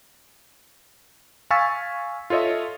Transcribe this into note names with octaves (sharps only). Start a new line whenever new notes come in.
F5 G#5 C#6 E6 A6 B6
F4 A4 C#5 D#5 E5